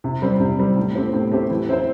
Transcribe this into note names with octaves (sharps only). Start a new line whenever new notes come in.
C3
G3 C4
C3
G3 C4
A2
A3 C4 G4 C5
A2
A3 C4 G4 C5
E3
C4 E4 C5